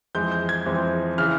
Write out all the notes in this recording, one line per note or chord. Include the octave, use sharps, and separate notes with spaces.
F2 E3 G#3 C4 G6
G6
G#6
F2 E3 G#3 C4
C#3 E3 F6